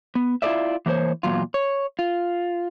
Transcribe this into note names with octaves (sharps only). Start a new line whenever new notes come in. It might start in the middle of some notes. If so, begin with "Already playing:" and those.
B3
E4 F4 A4 B4 D5 E5
E3 A#3 A#4 C5 C#5
E2 A#2 F#3 F4
C#5
F4